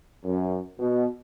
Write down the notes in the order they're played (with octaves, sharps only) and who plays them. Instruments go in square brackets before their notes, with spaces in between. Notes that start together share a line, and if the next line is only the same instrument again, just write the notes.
[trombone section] F#2
B2